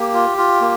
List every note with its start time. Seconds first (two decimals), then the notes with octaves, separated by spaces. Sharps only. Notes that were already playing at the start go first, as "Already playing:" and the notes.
Already playing: A#3 G4
0.14 F4
0.38 F4
0.61 A#3